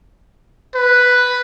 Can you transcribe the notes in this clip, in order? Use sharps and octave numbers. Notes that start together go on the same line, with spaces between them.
B4